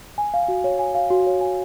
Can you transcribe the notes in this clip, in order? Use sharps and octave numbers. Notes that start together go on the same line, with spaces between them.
G#5
F5
F#4
C#5
G#5
F5
F#4
C#5
G#5